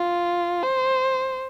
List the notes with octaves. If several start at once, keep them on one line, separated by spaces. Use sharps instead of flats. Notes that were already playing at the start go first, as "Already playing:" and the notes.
Already playing: F4
C5